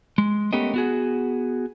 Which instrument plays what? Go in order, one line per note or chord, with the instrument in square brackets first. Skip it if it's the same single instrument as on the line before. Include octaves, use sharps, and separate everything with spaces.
[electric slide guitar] G#3
A3 B3 C#4 G4 A#4 D#5
B3 F#4 G#4